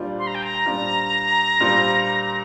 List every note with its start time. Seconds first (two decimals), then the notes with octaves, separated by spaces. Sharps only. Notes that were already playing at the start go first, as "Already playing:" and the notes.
Already playing: A#2 G3 D4 F4 C5
0.19 C6
0.27 A#5
0.35 G5
0.43 A#5
0.66 A#2 G3 D4 F4 C5
1.60 A#2 G3 D4 F4 C5